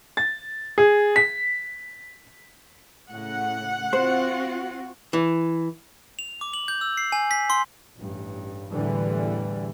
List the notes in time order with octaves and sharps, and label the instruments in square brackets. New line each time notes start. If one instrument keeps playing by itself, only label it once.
[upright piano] A6
G#4
B6
[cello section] A2 C#3 [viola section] F#5
[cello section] C4 F4 F#4 [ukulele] C5
[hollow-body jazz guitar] E3
[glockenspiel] F7
D6
F#7
G6
E6
C7
G#5
B6
C6
[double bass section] A1 G2
E2 A2 D3 E3 G3